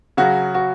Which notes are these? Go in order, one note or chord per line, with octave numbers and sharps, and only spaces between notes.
C#3 F#3 F#4
F#4